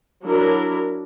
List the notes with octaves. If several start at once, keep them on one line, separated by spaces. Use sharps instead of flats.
F#3 D4 E4 A#4